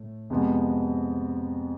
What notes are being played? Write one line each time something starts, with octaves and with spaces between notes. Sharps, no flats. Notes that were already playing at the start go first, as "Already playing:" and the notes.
Already playing: A2 A3
F2 C3 F3 G#3 B3